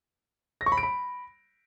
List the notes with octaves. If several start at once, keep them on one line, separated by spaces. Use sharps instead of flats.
A#6
C#6
B5
D7
B5